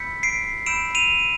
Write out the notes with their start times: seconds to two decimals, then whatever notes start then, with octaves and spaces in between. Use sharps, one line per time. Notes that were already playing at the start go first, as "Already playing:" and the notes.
Already playing: B5 E6 G6 B6 C#7
0.23 C7 D7
0.66 B5 E6 G6 D7 E7
0.95 D#7 F7